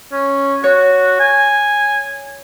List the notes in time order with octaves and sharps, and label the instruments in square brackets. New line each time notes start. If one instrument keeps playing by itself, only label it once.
[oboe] C#4
[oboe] F#4 [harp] C#5
[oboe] G#5